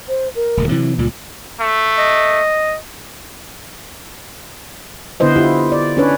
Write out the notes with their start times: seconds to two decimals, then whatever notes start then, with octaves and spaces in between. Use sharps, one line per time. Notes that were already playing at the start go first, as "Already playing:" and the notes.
0.08 C5
0.35 A#4
0.57 D#1 D2 G2
0.69 C3 E3 F#3 E4
0.98 C#2 A#2 G3 F4
1.60 A3
1.98 D#5
5.20 D3 B3 E4 B4 C5 D#5
5.36 E4 F4 G4
5.72 D5
5.97 C#4 D4 B4 C#5